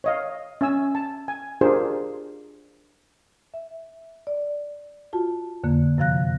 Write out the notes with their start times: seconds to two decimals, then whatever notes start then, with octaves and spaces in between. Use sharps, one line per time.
0.04 C#5 D#5 F5
0.61 C#4 E5 G#5 E6
0.95 A5
1.28 G#5
1.61 D4 F4 G4 G#4 A#4 C5
3.54 E5
4.27 D5
5.13 F4 F#4 A5
5.64 F2 D3 A#3
5.98 F#2 C3 F3 F5 F#6 A#6